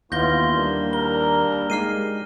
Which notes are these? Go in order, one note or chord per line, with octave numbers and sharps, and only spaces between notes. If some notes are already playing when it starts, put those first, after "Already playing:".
D#2 E3 B3 E4 F4 G6 A#6 G7
G3 A#3 D4
A#4 G7
G#3 D#4 G4 F6 C7 D#7